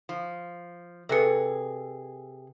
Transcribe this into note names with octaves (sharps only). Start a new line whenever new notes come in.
F3
C3 G#4 A4 B4 C#7